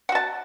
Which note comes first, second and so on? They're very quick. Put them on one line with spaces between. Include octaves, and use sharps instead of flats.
F#5 F#4 A5